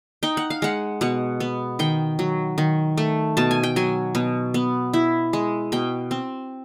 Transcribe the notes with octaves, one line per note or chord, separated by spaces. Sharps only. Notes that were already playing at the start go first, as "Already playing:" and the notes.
D#4 G5
F#5
F5
G#3 F#5
B2 F#5
B3
D#3 G5
F#3
D#3
A3
B2 A5
G#5
G5
F#3 G#5
B2
B3
E4
G#3
B2 G5
C4